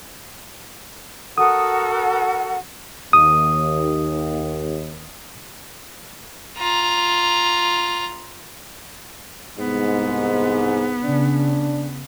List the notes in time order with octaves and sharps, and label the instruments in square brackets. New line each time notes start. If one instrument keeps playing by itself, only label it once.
[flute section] F#4 A4 A#4 [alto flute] F#5 [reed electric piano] D#6
[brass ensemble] D#2 [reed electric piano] D#6
[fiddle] F4 A#5
[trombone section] C2 G#2 [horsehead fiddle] B3
[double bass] C#3 [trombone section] D4